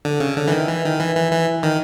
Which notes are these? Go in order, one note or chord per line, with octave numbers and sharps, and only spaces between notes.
D3
C#3
D3
E3
D#3
E3
D#3
E3
E3
E3
D#3